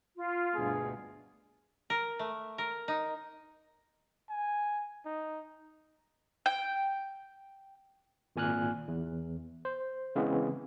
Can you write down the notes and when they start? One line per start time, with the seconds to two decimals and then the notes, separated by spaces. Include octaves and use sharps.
0.17 F4
0.55 D2 G2 B2 G#4
1.90 A#4
2.19 A3
2.58 A#4
2.88 D#4
4.29 G#5
5.06 D#4
6.46 G5
8.36 G#1 A#2 G#5 F6 F#6
8.88 E2
9.65 C5
10.16 C#3 E3 G#3 B3 C4